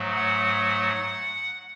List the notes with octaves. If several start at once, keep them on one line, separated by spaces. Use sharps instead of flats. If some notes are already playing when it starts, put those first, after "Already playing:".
Already playing: G#2 F#3 A3
F#5